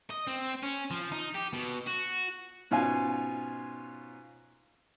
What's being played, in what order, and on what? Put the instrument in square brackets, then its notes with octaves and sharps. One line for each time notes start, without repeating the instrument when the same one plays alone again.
[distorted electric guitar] D#5
C4
C#4
F3
D#4
G4
B2
F#4
[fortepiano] G#2 B2 C#4 F4 F5 G#5